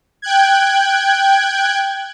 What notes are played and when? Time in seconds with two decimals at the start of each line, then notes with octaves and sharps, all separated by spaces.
0.22 G5 F#6 G#6